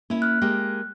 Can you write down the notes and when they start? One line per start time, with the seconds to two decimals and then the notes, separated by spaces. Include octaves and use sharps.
0.10 A#3 C#4 E4
0.22 F6 F#6
0.42 G#3 A#3 G4